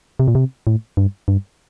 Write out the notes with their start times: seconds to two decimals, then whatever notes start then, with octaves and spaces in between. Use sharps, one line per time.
0.20 C3
0.28 A#2
0.35 C3
0.67 A2
0.97 G2
1.28 G2